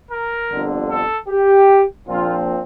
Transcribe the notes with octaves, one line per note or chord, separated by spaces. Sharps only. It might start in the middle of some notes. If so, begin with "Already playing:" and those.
A#4
G1 F2 D3
A4
G4
A#1 A#2 F3 C4 F4